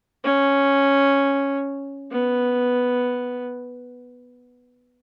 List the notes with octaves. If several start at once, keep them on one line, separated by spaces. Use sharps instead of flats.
C#4
B3